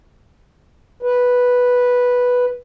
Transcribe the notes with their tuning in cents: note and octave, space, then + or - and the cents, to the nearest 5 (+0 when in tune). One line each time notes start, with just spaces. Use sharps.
B4 -5